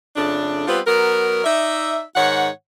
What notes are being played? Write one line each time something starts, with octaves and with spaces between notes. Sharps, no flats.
F2 C#3 A3 D4
G3 B3 C4 F4 B4
F#3 B3 A#4
D#4 D5 E5
G#2 D#3 C#5 F#5